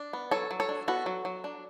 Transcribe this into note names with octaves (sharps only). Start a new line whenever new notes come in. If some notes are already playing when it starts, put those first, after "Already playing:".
Already playing: D4
B3
F#3 A4 C#5
F#3
A4 C#5
D4
B3 F#4 A4
F#3
F#3
D4